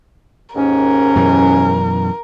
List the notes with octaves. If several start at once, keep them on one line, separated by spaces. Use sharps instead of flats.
D#2 G#2 C#4 A#4
F#2 B2 E3